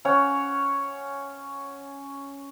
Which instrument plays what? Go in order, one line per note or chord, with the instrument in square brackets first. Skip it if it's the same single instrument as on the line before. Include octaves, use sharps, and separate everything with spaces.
[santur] C#4 C#5 F#5